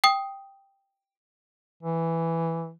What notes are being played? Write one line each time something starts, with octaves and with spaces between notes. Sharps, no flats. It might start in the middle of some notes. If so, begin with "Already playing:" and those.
G5 D#6
E3